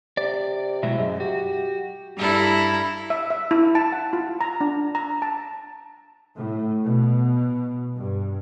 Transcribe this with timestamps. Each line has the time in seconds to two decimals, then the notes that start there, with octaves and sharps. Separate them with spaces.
0.17 C3 D5
0.83 B2 F#3 G#3 E4
0.98 F#2 G#3
1.20 F#4 G4
2.18 G2 E4 A4 A#5
3.10 E5
3.30 E5
3.51 E4
3.75 A5
3.92 F#5
4.13 F4
4.41 A#5
4.61 D4
4.95 A#5
5.22 A5
6.36 A2
6.84 B2
7.97 G2